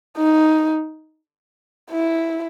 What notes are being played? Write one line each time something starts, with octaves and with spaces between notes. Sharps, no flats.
D#4
E4